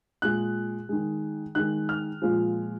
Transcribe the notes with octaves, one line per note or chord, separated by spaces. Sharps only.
A#2 G#3 F#6
D#3 G#3
D#3 G#3 F#6
F6
A#2 F3 G#3